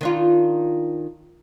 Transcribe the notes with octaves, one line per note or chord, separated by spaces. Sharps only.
D#3 D4 F4